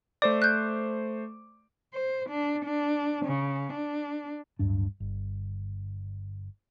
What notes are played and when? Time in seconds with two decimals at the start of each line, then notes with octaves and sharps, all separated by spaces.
0.22 A3 C5 D5 D6
0.42 F#6 G6
1.94 C5
2.29 D4
2.65 D4
3.25 C#3
3.72 D4
4.59 D1 G2 D4
5.00 G1